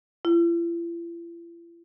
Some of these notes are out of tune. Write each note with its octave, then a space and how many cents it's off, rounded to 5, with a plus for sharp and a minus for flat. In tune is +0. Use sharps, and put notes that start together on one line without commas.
E4 +45